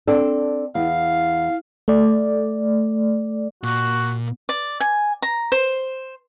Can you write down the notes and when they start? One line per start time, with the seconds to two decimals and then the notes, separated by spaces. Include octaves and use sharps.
0.07 C4 D4 A4
0.75 E2 F5
1.88 A3 D5
3.63 A#2 F#4
4.49 D5
4.80 G#5
5.22 A#5
5.52 C5